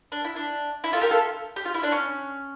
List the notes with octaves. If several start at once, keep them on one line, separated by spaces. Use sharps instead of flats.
D4
E4
D4
E4
F4 A4
G4 A#4
F4 A4
G4
F4
E4
D4
C#4